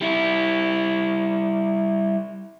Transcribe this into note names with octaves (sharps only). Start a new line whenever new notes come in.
G3 E4